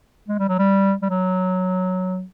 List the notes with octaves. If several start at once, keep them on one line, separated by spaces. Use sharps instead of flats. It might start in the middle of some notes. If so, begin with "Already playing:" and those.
G#3
G3
F#3
G3
G3
F#3